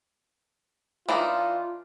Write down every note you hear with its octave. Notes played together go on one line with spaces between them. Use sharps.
E3 D4 D#4 F4